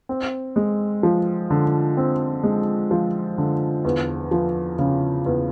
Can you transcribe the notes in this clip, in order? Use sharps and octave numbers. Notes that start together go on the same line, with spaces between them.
C4
G#3
F3
D3
C4
G#3
F3
D3
E2
F3
C#3
E2